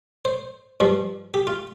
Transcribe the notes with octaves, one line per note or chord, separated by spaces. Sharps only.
C5
G2 F3
G4
F4